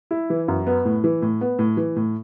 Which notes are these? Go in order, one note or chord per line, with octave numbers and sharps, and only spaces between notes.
E4
E3
F#2
B3
A2
E3
A2
B3
A2
E3
A2